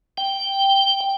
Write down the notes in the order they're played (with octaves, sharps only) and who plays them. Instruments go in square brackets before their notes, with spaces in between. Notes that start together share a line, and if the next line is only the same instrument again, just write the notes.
[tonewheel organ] G5